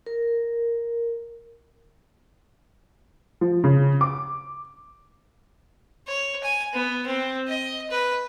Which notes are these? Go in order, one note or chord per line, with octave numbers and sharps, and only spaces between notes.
A#4
F3
C#3
D6
C#5
G#5
B3
C4
D#5
B4